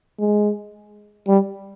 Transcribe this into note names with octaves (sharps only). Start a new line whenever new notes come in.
G#3
G3